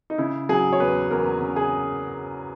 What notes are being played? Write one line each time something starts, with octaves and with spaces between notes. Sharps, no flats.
D#4
C#3 E4
F#3 G#4
C#5
E2 B4
E2 A#4
C#3
G#4